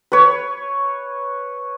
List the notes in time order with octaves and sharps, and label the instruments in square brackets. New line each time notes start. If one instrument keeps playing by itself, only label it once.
[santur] B4 C#5